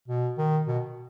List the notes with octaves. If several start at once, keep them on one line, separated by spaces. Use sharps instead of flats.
B2
D#3
B2